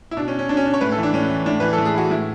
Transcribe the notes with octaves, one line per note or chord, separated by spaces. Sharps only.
E4
B2 D4
C#4
C#4
B2 D4
C#4
D4
C#5
A2 B4
A4
E3
D4
A2 C#4
E3
A2 D4
E3 B4
A4
A2
G#4
E3 F#4
A2 E4